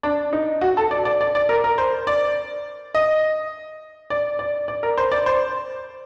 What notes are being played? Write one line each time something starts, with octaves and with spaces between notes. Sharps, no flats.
D4
D#4
F#4
A4
D5
D5
D5
D5
A#4
A#4
C5
D5
D#5
D5
D5
D5
A#4
C5
D5
C5